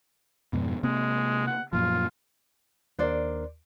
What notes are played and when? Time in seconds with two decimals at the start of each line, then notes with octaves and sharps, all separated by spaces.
0.53 F2 G#2 B2
0.83 C3 G#3 A#3 C4
1.47 F#5
1.73 F#2 A#2 F3 F4
2.99 D#2 D4 A#4 C5 D5